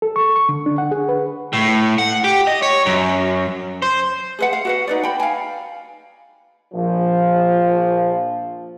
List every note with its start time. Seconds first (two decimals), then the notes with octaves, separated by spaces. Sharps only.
0.02 A4
0.16 C#6
0.36 C#6
0.49 D3
0.66 D4
0.78 F#5
0.91 G#4
1.09 B4
1.53 A2
1.98 F#5
2.24 G4
2.47 D#5
2.63 C#5
2.86 F#2
3.82 C5
4.39 G#4 B4 F#5
4.53 F5
4.65 F#4 B4 F#5
4.87 D#4 B4 D5
5.03 G5 B5
5.20 F5 G#5
6.74 A#1 F3